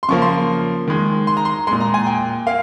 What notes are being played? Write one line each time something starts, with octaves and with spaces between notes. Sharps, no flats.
C6
C#3 F3 A#3 C#6
C6
D#3 G#3
C6
A#5
C6
A#2 G#3 C6
A#5
G#5
G5
A#3 F5